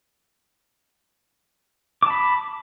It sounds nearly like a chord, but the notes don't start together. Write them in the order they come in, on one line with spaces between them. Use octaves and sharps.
D6 A5 B5